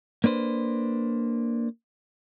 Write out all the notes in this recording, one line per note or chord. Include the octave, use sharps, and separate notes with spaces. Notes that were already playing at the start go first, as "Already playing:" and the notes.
A#3 D4 B4 C5